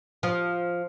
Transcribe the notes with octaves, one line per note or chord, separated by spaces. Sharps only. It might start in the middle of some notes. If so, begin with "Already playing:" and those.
F3